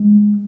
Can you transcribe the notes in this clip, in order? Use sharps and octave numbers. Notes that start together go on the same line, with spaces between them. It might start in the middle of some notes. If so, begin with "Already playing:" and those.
Already playing: G#3